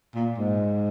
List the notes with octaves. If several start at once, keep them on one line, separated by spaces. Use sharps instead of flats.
A#2
G#2